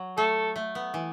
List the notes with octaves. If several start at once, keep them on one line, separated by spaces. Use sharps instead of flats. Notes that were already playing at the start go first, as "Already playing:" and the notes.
Already playing: F#3
A3 A4
A3
B3
E3